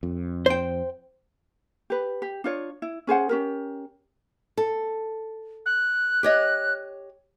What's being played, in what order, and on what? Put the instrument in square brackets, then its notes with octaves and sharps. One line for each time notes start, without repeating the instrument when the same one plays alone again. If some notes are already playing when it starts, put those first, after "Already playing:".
[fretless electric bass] F2
[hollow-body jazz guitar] C5 G5
[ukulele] G4 B4
G4
D4 F4 C#5
E4
C#4 G#4 C5 F#5
C#4 G4 A#4
[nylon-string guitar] A4
[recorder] F#6
[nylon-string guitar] G4 C#5 D#5